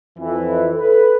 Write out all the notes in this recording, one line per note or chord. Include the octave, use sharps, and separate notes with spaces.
F2 E3
A4 B4